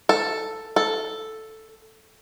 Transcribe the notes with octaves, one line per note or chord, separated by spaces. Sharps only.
A4
A4